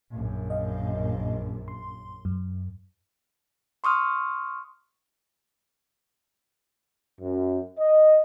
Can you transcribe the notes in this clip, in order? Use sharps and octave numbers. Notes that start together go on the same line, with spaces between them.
A#1 F#2
D#5 F5
C6
F#2
C6 C#6 D#6 F6
F#2
D#5